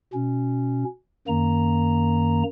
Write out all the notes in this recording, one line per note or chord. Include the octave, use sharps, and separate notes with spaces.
B2 C#4
F#2 D#3 A#3 A#5